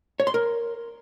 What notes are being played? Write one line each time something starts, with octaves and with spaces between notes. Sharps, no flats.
C#5
C6
A#4